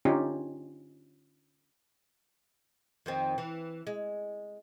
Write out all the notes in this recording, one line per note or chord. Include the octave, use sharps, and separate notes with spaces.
D3 C#4 D#4 F4 G4
F2 D#3 C4
E3
G#3